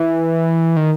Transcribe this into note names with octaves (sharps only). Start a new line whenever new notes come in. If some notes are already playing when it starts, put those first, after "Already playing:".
Already playing: E3
D#3